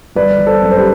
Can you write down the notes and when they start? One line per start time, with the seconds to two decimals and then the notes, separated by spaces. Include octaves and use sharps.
0.15 G1 B4 D5
0.38 G1
0.47 A4 C5
0.62 F#2
0.71 C5
0.77 G4 B4